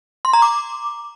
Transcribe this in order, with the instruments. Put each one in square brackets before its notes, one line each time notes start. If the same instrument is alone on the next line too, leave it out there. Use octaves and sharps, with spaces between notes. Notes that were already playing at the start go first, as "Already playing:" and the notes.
[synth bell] C6
A#5
D6